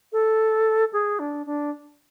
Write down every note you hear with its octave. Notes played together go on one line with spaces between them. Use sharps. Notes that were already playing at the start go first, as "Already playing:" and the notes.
A4
G#4
D4
D4